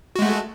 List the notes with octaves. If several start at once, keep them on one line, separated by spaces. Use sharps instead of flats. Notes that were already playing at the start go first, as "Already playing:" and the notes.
G#3 A3 F#4